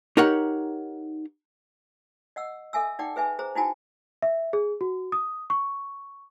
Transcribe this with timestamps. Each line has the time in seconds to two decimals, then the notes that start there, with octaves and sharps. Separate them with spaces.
0.17 D#4 G4 A#4 C#5 F#5
2.36 D#5 F#5 E6
2.73 A4 E5 G#5 E6
2.99 D#4 D5 F#5 G5 D6
3.16 G#4 B4 E5 G#5
3.39 G#4 C5 A#5
3.55 D#4 E4 F#4 G5 G#5 A#5
4.22 E5
4.53 G#4
4.81 F#4
5.12 D#6
5.50 C#6